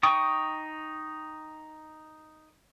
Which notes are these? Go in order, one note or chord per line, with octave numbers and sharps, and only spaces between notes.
D#4 G5 C#6 D#6